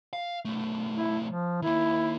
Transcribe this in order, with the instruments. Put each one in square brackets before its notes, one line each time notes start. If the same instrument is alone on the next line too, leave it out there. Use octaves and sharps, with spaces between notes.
[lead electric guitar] F5
B1 A3
[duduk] E4
F3
[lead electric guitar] D#3 A#3 [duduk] E4